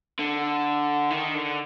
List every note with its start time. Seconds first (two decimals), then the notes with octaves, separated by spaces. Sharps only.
0.19 D3
1.11 D#3
1.34 D3